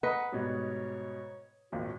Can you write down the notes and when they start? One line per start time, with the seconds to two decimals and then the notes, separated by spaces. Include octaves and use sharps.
0.03 B4 D#5 F#5 A#5 D#6
0.32 G#2 B2 G3 C#5
1.72 G#1 D#2 A#2 F#4